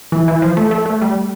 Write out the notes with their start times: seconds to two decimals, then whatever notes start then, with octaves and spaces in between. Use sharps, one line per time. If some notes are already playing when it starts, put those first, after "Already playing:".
0.12 E3
0.28 E3
0.42 F3
0.57 A3
0.71 A3
0.86 A3
1.02 G3